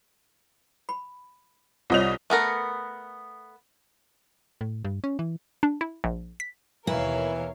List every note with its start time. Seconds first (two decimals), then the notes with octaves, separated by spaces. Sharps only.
0.89 B5
1.90 C2 F4 C5 C#5 D#5 F7
2.30 A3 B3 A#4
4.61 A2
4.85 G2
5.04 C#4
5.19 E3
5.63 D4
5.81 E4
6.04 A#1
6.40 B6
6.87 D#2 B2 E3 E4 A#4 C#5 F5